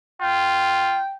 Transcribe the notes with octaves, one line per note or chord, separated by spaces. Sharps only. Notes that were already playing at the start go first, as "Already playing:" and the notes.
F4 G5